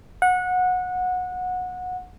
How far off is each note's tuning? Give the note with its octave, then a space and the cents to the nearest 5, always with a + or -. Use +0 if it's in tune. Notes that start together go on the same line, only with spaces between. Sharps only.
F#5 -20